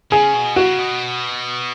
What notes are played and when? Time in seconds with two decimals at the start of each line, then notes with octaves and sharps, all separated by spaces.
0.12 C#3 G#4
0.34 B2
0.56 C#3 F#4
0.78 B2